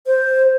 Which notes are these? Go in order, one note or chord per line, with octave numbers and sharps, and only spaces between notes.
C5